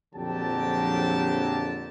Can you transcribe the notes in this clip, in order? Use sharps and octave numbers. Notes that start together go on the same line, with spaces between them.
A#1 F2 D3 F#3 G4 A5